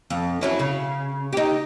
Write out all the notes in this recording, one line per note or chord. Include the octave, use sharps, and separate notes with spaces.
F2
F#3 C#4 E4
C#3
D#4 G4